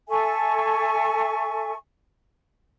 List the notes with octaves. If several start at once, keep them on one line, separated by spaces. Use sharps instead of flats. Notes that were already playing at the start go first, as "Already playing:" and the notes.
A4 E5 G#5 C#6